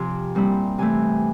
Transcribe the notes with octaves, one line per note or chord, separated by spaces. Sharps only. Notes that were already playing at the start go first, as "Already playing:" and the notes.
Already playing: F2 C3 F3 G#5
A#2 G3 C4 E4
C3 E3 A3 G#5